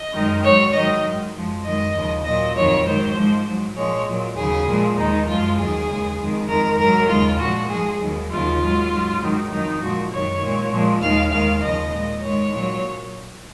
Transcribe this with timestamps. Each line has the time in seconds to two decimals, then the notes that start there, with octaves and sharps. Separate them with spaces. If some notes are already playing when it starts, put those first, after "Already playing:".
Already playing: D#5
0.13 F#2 D#3 G#3
0.43 G#2 F#3 C#5
0.74 G#2 D#3 F#3 D#5
1.04 G#2 F#3
1.34 F#2 F3 G#3
1.64 F#2 D#3 G#3 D#5
1.94 D#2 C#3 F3
2.25 A#2 F#3 D#5
2.55 F2 D#3 F#3 C#5
2.86 G#2 D#3 F#3 C5
3.16 G#2 F3 G#3
3.46 G#2 F#3
3.76 A#2 F3 G#3 C#5
4.06 A#2 F#3
4.36 D#2 C#3 F#3 G#4
4.67 A#2 F3 G#3
4.96 D#2 D#3 G#3 D#4
5.27 F#2 F3 G#3 F4
5.57 D#2 D#3 F#3 G#4
5.87 D#2 C#3 G#3
6.18 F2 D#3 G#3
6.48 F2 D#3 G#3 A#4
6.78 G#2 F#3 A#4
7.08 D#2 C#3 G#3 F4
7.38 A#2 F3 G#3 F#4
7.69 G#2 F3 G#3 G#4
7.99 D#2 D#3 F#3
8.30 D#2 C#3 F#3 F4
8.60 G#2 F#3
8.90 G#2 F#3
9.20 G#2 D#3 F#3
9.50 F2 D#3 F#3 D#4
9.81 A#2 F3 G#3 F#4
10.11 F#2 D#3 F#3 C#5
10.41 A#2 G#3
10.71 A#2 F3 G#3
11.01 D#2 D#3 G#3 F5
11.32 D#2 D#3 G#3 F5
11.61 D#2 C#3 F3 D#5
11.92 A#2 G#3
12.22 G#2 D#3 G#3 C#5
12.52 A#2 F#3